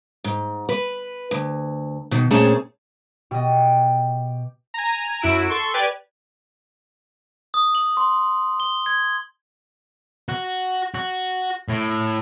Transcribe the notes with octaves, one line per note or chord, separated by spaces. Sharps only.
G#2
B4
D2
B2 D#3
A#2 A3 C4 C#4 G#4 A5
B2 G4 D#5
G#5 A#5
F#2 E4 F#4 E6 D7
A4 C6 C#6
G4 B4 D5 G#5
D#6
F#7
C6
G7
G#6
F#4
F#4
A2